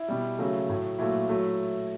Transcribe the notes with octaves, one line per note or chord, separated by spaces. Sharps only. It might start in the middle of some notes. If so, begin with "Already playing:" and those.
Already playing: E4
B2 G3
C#3 F#3 A3
A2 F#3 A3
A#2 F#3 A3 E4
F#3 A3